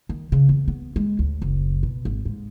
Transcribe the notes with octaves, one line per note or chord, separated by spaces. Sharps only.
D#3
C#3
E2
B3
G#3
D2
F#1
B2
G#1
G#2